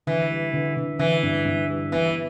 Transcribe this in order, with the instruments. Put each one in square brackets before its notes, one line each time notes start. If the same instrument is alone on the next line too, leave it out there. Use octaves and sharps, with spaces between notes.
[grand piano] D3 [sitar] E3
[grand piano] G3
D3
D3
[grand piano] D3 [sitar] E3
[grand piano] G2
G2
G3
[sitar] E3 [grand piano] B3